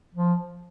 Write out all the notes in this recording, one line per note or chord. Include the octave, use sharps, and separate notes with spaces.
F3